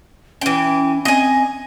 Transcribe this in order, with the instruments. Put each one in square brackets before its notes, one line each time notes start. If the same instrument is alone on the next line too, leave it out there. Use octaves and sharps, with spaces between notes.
[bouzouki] E3 G5 [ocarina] C#4
[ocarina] C4 [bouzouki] D#5 G#5